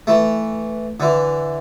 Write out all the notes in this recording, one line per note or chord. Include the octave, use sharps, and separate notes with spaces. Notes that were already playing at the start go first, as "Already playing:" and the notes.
E3 A3
D3 E3